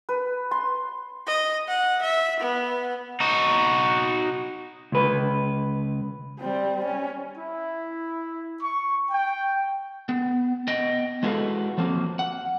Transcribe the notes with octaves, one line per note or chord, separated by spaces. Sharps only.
B4
C6
D#5
F#5
E5
B3
D#4 F#4
C#2 B4
G3 C4
C#4
E4
C#6
G5
B3
B3 D#5 G5
G#3 E4 F#4 A4 B4 F5
F3 F#3 A#3 C4
F#5